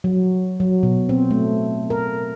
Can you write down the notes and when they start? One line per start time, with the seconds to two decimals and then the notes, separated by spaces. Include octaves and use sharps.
0.04 F#3
0.60 F#3
0.83 B2
1.09 C4
1.31 A3
1.90 A#4